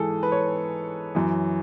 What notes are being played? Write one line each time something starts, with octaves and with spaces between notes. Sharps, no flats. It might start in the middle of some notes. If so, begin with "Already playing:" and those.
Already playing: G#2 E3 G#4 A4
B4
C#5
F#2 E3